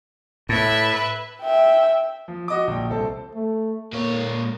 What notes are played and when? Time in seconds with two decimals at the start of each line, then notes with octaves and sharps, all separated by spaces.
0.49 A2 B4 E5
1.42 E5 G5
2.28 F3
2.48 F#4 D#5 D6
2.67 A#1 G5
2.90 C2 A4 C5 A5
3.34 A3
3.93 A#2 A#3 C#5